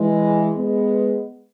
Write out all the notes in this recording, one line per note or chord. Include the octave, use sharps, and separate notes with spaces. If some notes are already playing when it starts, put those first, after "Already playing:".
Already playing: E3 G#3
G#3 B3